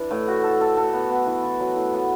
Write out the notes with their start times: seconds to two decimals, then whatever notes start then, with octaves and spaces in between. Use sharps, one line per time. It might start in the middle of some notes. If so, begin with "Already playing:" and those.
Already playing: E3 D4
0.11 A2
0.28 F#4
0.44 A4
0.61 A4
0.77 A4
0.93 B3
1.10 B3
1.27 E3
1.44 E3
1.60 F#3
1.76 A2
1.93 B3